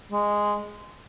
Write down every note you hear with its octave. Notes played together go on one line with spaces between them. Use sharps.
G#3